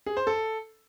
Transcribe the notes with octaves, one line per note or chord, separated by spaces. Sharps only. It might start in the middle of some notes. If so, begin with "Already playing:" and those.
G#4
C5
A4